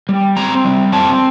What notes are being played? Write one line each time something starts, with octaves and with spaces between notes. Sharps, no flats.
G3
C4 A#5
G3
C4 A5